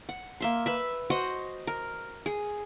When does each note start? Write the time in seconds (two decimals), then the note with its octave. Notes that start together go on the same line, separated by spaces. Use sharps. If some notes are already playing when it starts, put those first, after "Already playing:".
0.09 F#5
0.41 A#3 E5 C6
0.66 B4 E5
1.10 F#4 C5 D#5 F#5
1.67 A#4
2.26 G#4